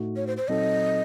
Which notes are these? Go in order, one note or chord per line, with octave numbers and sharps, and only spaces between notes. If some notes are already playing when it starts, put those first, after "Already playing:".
Already playing: A2 A3 D#4 F#4
C#5
C5
C5
A#2 F#3 C4 D#4 A4 D#5